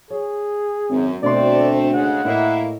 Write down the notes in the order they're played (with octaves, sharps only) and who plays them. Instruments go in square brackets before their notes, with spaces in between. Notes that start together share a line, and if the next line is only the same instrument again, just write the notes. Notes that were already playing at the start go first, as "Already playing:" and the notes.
[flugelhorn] G#4 [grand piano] C#5
[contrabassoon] G#1 [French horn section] F#2
[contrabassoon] D2 [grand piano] B2 D4 C6 [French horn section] A3 C4 [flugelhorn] D5
[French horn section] C#3 G#3 [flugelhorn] F#5
[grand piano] A2 D#5 [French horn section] A#3 E4